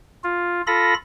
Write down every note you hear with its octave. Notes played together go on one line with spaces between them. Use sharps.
F4
F4 A4 B5 A#6